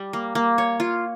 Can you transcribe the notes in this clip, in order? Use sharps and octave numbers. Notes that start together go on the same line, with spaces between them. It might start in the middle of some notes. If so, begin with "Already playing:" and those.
Already playing: G3
A#3
A#3
C#5
F4